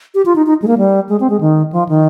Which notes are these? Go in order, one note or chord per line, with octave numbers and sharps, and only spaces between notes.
G4
F4
D#4
D#4
G#3
A#3
G3
G#3
C4
G#3
D#3
F3
D#3